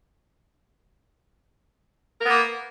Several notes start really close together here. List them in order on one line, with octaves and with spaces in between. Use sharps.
A#4 B3 A#3